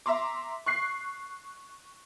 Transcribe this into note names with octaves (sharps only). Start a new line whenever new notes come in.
E5 A#5 C6 D6
C#6 F#6 C7